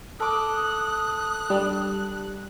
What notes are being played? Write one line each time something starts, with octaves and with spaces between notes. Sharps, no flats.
A4 D6 D#6 F#6
G3 D4